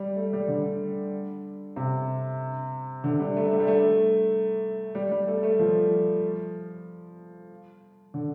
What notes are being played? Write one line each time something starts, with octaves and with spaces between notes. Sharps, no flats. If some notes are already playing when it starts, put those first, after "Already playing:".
Already playing: G3
A3
G3
D3
C3
D3
G3
A3
A3
G3
A3
G3
G3
A3
A3
F3
D3